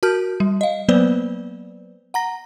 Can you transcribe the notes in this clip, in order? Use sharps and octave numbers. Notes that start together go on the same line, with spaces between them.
F#4 A#4 A5 F6 G6
G3
D#5 F5
F#3 A#3 B3 B4 C5 D5
F#5 A#5 A#6